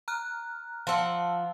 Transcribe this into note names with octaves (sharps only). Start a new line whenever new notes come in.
A#5 F6 F#6
F3 F5 F#5 A5 E6